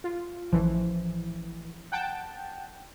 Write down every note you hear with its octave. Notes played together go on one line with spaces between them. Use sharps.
F4
A1 E3 F3
F#5 G5 A5